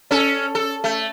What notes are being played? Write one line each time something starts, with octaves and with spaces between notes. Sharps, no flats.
C#4 A4
A4
A3